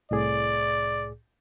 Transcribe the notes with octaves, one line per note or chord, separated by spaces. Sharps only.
C2 A2 G#4 D5